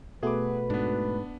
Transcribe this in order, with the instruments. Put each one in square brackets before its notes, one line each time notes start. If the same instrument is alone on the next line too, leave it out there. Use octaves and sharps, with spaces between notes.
[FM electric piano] B2 A3 F#4 [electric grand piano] G#4 D6 [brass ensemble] B4
[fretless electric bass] G#2 [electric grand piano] B3 D4